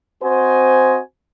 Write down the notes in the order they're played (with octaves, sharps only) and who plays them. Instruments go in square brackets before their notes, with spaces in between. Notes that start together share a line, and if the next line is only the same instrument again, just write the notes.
[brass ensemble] C4 F#4 C5 D#5 G#5